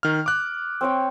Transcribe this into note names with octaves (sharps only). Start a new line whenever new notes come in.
D#3 F6
D6 F#6
C4 C#5 G5